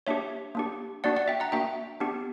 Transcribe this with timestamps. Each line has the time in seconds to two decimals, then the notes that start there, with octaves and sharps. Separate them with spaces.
0.07 A#3 D4 G4 C#5 E5
0.55 A#3 D4 G4
1.04 A#3 D4 F#4 D5 F#5
1.16 D5 F#5
1.28 E5 G5
1.40 F#5 A#5
1.52 A#3 D4 F#4 E5 G5
2.00 B3 D4 G4